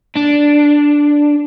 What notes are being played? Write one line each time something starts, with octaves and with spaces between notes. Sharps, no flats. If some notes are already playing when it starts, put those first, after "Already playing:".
D4